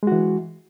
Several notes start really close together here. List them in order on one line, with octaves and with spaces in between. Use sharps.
G#3 F#4 E3